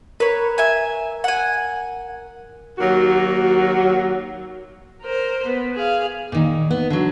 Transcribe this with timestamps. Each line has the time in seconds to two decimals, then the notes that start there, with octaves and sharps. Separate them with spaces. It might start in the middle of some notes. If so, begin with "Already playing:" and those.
0.20 A#4 B4 C#5
0.58 E5 G#5
1.24 F#5 G#5
2.79 D#2 F#3 A#3 F#4
5.02 A#4 C5
5.46 B3
5.75 G#4 F5
6.32 A#2 D#3
6.71 B3
6.90 D3 F#3